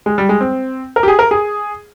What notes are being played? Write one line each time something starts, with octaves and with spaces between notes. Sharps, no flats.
G#3
G3
G#3
C4
A#4
G4
G#4
A#4
G#4